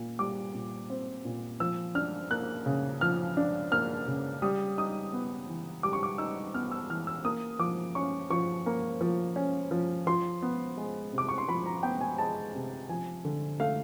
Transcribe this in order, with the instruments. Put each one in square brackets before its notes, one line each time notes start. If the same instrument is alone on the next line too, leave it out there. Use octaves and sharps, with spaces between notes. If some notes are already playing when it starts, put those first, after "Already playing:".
Already playing: [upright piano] A#2
G3 D6
A#2
C4
A#2
F3 E6
D4 F6
A#3 F#6
C#3
F3 F6
D4
A#3 F6
C#3
G3 D#6
D#4 D#6
B3
E3
G3 D6
C#6
D6
D#4 E6
B3 F6
E6
E3 F6
E6
A#3 D#6
F3 D6
C#4 C#6
F3 C#6
A#3
F3
C#4
F3
F3 C6
B3
G#3
C3
D6
C#6
C6
F3 B5
A#5
B3 G5
G#5
G#3 A5
C3
F3 G#5
D3
A3 F5